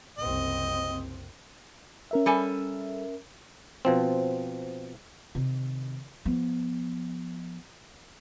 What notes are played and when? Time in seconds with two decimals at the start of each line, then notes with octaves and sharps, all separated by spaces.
0.18 F#1 C2 C4 D#5
2.11 C#4 A#4 E5
2.26 G3 A4 G#5
3.85 B2 F3 C4
5.35 C3 D#3
6.25 F3 B3